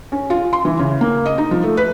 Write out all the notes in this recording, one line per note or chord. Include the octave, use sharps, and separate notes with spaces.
C#4
F4
C6
E3
C#3
A#3
D#5
D#4
F3
A3
B4